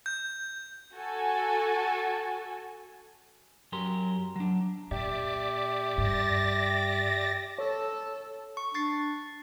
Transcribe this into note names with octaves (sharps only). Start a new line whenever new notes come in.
G6
F#4 A4 G#5
F#2 F#3 G4 A#4 C6
F#3 D4
A#2 G4 D5 E5 D6
G2 A6 A#6
A4 C#5
C#6
D4 C#6 A6 C7